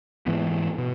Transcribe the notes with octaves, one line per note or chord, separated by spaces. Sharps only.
G#2 E3 B3
B2